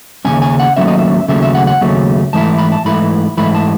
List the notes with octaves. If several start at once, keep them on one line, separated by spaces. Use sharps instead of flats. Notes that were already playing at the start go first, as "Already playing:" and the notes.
D#2 C#3 F#3 A3 C#4 G#5
G#5
F#5
D#2 C#3 F#3 A3 C#4 E5
D#5
E5
D#2 C#3 F#3 A3 C#4 E5
E5
F#5
F#5
D#2 C#3 F#3 A3 C#4
G#2 E3 A3 E4 A5
B5
A5
G#2 E3 A3 E4 B5
G#2 E3 A3 E4 B5
A5